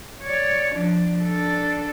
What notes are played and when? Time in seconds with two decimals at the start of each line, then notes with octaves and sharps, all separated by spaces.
0.22 C#5 D5
0.75 F3 D4
1.23 D4 A4